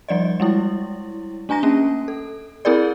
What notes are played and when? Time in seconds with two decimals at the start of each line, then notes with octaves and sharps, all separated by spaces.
0.08 F3 G3 D5 D#5
0.40 G3 G#3 E4
1.49 A3 D4 G#5 A#5 A#6
1.63 A#3 C#4
2.08 A4
2.65 C4 E4 G#4 A#4 D5